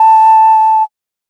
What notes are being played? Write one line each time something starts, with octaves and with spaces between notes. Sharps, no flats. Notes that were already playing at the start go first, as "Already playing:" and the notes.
Already playing: A5